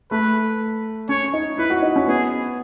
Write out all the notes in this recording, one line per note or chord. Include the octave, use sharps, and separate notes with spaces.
A3 B4
C#4 C#5
D#4
E4 B4
F#4
D#4
C#4
B3 G#4